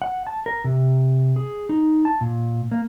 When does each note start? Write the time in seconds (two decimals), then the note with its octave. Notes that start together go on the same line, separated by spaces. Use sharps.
0.02 F#5
0.27 A5
0.46 A#4
0.64 C3
1.36 G#4
1.69 D#4
2.05 A5
2.21 A#2
2.71 A#3